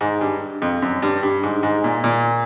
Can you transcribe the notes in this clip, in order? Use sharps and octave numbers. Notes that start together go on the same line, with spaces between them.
G#2
G2
F2
F#2
G2
G2
G#2
G#2
A#2
A#2